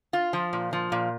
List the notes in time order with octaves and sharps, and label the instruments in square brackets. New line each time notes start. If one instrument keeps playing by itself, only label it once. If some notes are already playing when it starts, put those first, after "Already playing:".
[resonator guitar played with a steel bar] F4
F3
A#2
F3
A#2